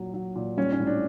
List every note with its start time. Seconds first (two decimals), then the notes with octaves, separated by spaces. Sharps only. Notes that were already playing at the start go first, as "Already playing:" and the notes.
Already playing: A#2 F#3
0.14 F#3
0.36 A#2
0.57 G3 C#4
0.72 C#4
0.79 A2
0.87 D4